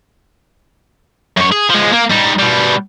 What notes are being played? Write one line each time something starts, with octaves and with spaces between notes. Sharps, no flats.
F#2 C#5
G#4
F3 G#3
A#3
G3 D#4
B2 G3